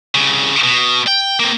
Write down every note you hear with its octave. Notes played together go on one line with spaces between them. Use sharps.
C2 C#3
B2
G5
A#3 C4